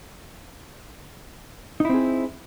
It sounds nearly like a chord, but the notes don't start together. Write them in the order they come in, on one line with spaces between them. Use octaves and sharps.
D#4 E4 C4 G#4